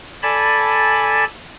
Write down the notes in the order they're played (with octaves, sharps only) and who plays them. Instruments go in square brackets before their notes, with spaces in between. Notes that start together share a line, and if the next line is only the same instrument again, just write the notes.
[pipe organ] A4 D5 G#5 A5 B5